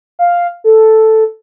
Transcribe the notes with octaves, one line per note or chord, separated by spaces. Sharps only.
F5
A4